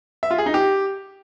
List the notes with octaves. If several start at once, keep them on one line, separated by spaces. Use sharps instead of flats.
E5
F4
G#4
D#4
G4